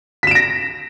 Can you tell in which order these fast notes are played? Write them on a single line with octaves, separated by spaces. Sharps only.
B6 E7 D7 A#6